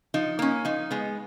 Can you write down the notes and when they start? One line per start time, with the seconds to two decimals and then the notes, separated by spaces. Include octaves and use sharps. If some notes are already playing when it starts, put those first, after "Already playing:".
0.14 F3 D#4
0.39 A#3 C#4
0.65 F3 D#4
0.91 G#3 B3